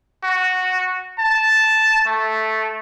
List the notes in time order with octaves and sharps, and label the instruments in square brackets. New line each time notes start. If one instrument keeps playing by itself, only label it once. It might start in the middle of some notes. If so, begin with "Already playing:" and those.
[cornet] F#4
A5
A3